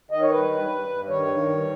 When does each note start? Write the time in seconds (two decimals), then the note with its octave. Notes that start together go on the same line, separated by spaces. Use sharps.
0.11 D#3 D#5
0.22 C#5
0.30 G2 B4
0.51 G2
0.70 G2
0.89 G2
1.09 D#3 C#5
1.28 D#3
1.48 G2